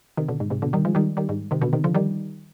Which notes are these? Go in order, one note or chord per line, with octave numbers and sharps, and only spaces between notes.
C3 D#3
B2 D3
G#2
G#2 C3
B2 D3
D#3 G3
F3 G#3
D#3 G3
D#3 G3
G#2
C3 D#3
B2 D3
C3 D#3
D3 F3
D#3 G3